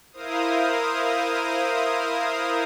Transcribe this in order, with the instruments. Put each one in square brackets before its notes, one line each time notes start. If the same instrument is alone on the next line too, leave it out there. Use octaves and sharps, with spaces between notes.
[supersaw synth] E4 A#4 C5 F5 D#6